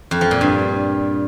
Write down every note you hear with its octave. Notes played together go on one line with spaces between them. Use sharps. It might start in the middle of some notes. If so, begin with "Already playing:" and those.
F2
F3
A#2
G2